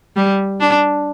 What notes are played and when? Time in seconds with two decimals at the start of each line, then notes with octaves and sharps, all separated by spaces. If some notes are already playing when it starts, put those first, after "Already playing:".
0.16 G3
0.60 D4